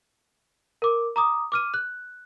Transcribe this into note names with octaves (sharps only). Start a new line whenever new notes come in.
A#4 D6
A#5 D6 D#6
D6 F6 D#7
F#6